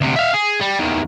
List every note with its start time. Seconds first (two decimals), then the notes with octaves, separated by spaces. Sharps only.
0.01 D2 C3
0.16 E5 F5
0.34 G#4
0.61 G3
0.79 E2 D#3